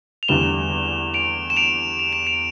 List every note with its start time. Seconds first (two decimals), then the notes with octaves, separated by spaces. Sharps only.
0.23 F7
0.28 E2 D3 G3 E7 G7
1.14 D7 F7
1.50 E7
1.56 D7 F7
1.99 F7
2.13 E7
2.27 D7 F7